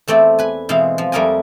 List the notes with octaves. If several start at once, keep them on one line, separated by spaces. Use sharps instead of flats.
E2 A3 C4 D5
B4 G#5
B2 E3 G#3 C4 F5
F3
F2 G3 A3 A#4 D#5 G#5